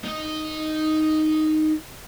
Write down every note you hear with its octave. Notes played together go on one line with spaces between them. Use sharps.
D#4 D#5